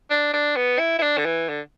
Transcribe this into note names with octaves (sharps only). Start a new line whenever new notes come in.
D4
D4
B3
E4
E4
D4
D3
E3
D3